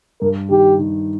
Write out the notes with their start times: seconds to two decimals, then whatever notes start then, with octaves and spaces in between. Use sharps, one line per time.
0.21 G2 A#4
0.50 D#3 G4
0.79 D#3